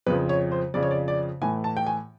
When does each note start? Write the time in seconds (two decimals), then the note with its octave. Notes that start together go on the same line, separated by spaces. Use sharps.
0.06 F2 C#3 F3 B4
0.29 C#5
0.52 C5
0.74 F2 C#3 F3 D5
0.83 C#5
0.91 D5
1.08 D5
1.41 A2 E3 A3 G#5
1.64 A5
1.77 G5
1.87 G#5